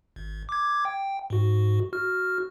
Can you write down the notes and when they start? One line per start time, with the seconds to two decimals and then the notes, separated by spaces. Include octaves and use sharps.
0.16 G#1
0.49 D6 G#6
0.85 G5
1.30 G#2 F#4
1.93 F#4 F6